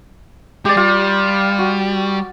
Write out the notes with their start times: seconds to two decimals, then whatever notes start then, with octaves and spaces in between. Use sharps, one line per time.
0.65 G#3 G4 D5
0.77 G3 F4
1.59 F#4